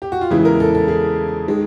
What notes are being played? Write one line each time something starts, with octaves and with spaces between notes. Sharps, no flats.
G4
F#4
F4
E2 C#3 E3 G#3 E4
A#4
A4
A4
G#4
D#3 G#3